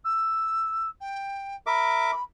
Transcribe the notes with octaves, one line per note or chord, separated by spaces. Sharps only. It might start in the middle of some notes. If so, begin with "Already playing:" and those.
E6
G5
A#4 E5 B5 D6